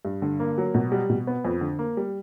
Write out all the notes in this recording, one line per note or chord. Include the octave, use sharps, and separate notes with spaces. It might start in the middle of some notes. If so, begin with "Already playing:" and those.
G2
D3
A#3
F#3
B2
G3
B2
B3
F2
D3
A#3
G3